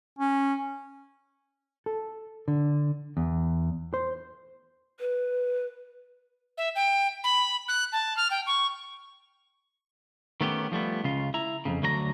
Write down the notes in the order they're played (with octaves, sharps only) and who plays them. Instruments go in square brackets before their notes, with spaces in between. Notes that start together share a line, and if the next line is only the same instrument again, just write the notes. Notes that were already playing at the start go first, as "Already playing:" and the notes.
[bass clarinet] C#4
[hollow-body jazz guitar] A4
D3
E2
C5
[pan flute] B4
[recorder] E5
G5
B5
F#6
A5
F6
G5
C#6
[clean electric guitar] D#3 A3 B3 C#4 G4
F3 G3 A3 B3
C#2 C#3 F4
E4 A#5
F2 A2 C#3
D2 D3 F#3 G#4 A#5